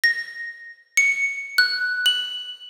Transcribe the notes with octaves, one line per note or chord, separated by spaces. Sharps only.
A#6
C#7
F#6
F#7